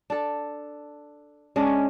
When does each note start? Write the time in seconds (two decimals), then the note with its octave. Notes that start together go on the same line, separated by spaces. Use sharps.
0.10 D4 A4
1.56 G#3 C#4 D4 D#5